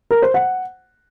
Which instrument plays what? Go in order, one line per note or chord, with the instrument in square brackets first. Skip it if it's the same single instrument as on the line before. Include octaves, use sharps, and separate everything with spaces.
[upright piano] A#4
C5
F#5